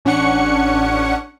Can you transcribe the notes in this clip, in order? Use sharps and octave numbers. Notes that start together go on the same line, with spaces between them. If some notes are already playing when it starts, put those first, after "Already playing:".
A1 C#4 D4 F#5 C#6 C#7